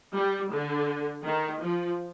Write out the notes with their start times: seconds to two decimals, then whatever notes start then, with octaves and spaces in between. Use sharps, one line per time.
0.15 G3
0.52 D3
1.25 D#3
1.62 F3